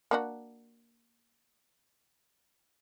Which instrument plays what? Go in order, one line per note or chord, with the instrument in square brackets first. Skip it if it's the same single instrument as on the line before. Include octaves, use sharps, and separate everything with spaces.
[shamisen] A#3 D4 F#4